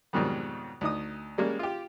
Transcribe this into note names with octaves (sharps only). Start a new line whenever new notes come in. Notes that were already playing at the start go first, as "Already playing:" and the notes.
F2 G#2 B2 D#3 F#3 G3
D2 D#4 D#6
G3 G#3 A#3 C#4
F4 G4